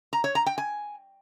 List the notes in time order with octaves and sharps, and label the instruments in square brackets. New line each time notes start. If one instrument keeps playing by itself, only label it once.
[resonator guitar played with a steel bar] A#5
C#5
A#5
G5
G#5